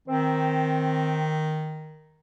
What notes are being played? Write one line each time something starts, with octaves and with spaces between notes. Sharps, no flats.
D#3 C4